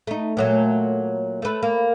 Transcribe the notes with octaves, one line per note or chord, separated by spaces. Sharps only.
A3 D#4
A#2 F#3 A3
A3 B4
A#3